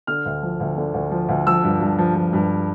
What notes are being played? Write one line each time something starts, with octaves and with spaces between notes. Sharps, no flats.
D3 F6
D2
F3
D2
D3
D2
F3
D2
F3 E6
G2
G2
F3
F3
G2